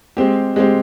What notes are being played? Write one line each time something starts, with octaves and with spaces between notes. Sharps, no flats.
G#3 C4 G4
G#3 C4 G4